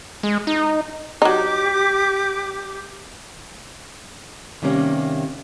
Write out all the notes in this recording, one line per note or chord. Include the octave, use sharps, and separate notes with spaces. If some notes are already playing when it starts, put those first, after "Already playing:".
G#3
D#4
F#3 D#4 G4 D6
C3 D#3 G3 A#3 C#4